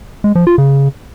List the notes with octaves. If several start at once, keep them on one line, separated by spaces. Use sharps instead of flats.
G#3
F3
F4
C#3